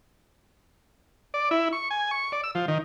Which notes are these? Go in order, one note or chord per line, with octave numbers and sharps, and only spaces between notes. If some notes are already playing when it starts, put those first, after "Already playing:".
D5
E4
C#6
G#5
C#6
D5
E6
F3
D#3